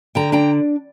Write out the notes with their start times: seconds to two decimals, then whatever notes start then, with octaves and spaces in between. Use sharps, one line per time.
0.15 D3 G5 A#5
0.32 D4 G5 A#5